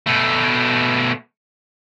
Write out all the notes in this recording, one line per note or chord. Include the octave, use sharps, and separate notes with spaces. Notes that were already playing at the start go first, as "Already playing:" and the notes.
B2 A3